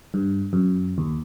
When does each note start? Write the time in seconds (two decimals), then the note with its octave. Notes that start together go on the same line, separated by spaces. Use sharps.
0.14 G2
0.53 F#2
0.98 D#2